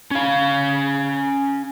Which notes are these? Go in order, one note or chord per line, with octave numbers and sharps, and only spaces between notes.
C#4 F5